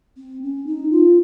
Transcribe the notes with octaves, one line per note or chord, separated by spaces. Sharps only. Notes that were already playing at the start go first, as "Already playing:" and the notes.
C4
C#4
D#4
F4